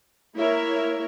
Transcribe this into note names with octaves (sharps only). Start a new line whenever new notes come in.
A#3 E4 A#4 C#5 E5